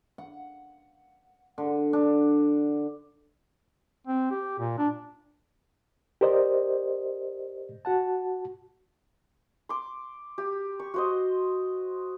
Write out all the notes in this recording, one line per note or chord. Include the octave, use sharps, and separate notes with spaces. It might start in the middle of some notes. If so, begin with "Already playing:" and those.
F#5
D3
D4
C4
G4
A#2
D4
G4 A#4 C5 D5 D#5
F#4 F#5 A5
C6 D6
G4
C#6
F#4 C5 D#5